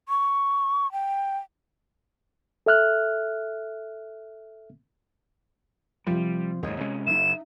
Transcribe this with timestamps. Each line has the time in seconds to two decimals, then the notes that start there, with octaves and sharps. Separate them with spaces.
0.09 C#6
0.92 G5
2.66 A4 E5 F6 F#6
6.07 C3 F3 G3
6.63 D#2 G#2 C#5 D#5
6.80 C3 G#3 C#4
7.07 F#1 D#4 E5 E7